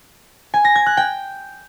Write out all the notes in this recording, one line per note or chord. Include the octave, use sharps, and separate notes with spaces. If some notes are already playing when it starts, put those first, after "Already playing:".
G#5
A#6
G#6
F#6
G5